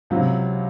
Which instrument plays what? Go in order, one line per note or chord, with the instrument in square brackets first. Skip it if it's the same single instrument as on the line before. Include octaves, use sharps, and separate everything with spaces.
[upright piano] C#2 C3 F#3